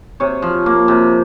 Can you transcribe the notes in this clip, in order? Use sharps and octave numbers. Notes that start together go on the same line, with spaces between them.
C3 C#5
F3
A#3
C3